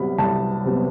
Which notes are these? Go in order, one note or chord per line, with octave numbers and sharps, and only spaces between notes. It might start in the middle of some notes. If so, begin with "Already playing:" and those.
Already playing: C2 C3 F#3 B3 B5
C2 A5
C3 F#3 B3